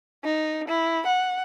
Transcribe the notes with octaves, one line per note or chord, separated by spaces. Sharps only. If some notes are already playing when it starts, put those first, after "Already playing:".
D#4
E4
F#5